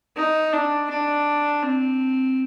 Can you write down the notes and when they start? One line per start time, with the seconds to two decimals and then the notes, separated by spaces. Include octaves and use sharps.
0.17 D#4
0.53 D4
0.90 D4
1.63 C4